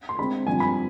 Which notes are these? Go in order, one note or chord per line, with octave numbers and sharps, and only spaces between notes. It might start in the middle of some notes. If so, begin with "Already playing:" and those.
C6
D3 G#3 C4 B5
G2 D3 F3 C4 G#5
B5